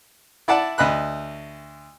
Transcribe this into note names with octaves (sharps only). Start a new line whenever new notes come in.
E4 D5 F#5 A5
D2 D#5 B5 F#6